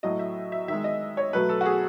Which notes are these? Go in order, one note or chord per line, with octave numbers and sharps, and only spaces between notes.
A2 F#3 A3 D#5
E5
E5
D#3 G#3 E5
D#5
C#5
B2 F#3 A3 B4
A4
F#4
G#4